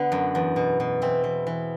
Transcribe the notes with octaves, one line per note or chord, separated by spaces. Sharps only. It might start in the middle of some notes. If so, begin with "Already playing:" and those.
Already playing: D3 B3
F#2
E2
B2
B2
E3 C4
E3
E3